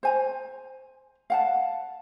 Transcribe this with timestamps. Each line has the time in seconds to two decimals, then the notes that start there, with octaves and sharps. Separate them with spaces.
0.03 C5 G#5 A#5
1.30 F5 F#5 A5